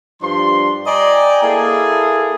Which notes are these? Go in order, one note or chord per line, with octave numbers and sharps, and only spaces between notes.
G2 F3 D4 C6
D5 D#5 G5 G#5 A#5
A#3 E4 G#4 A4